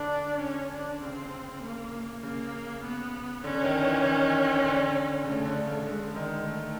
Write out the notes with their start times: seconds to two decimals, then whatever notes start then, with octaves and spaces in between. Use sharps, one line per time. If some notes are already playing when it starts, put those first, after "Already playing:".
Already playing: D3 D4
0.41 C#4
0.72 D4
1.02 C#3 C4
1.63 A#3
2.23 C#3 A#3
2.84 B3
3.44 D3 C#4
3.55 D3
3.64 D#3
3.84 E3
4.04 D#3
4.65 D3
5.25 C#3 A3
5.45 D3
5.66 C#3
5.86 D3 G#3
6.07 D3
6.16 D#3
6.46 D#3 A3